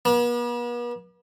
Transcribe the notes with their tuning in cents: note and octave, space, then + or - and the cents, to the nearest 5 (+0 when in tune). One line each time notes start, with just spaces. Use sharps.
B3 -45